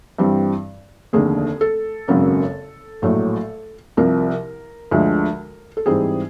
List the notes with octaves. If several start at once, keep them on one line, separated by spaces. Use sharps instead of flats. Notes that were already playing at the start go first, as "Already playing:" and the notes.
G2 E3 G3 C4
F1 D#2 D3 G#4
A4
G#1 F#2 C#3 F#3 A#3
A#1 A2 F#3 A3
C2 C3 F3 A#4
D2 D3 F3 G#3
A4
G#2 E3 G3 C4 G#4